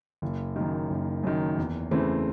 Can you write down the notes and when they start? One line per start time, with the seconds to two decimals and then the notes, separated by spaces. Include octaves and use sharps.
0.22 F#1
0.56 F#2 D#3
0.90 F#1
1.23 F#2 D#3
1.57 E2
1.91 C#3 E3 A3 C4